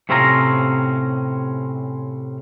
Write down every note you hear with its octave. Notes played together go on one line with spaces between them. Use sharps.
A2 C3 C4 C#4 F4 A#5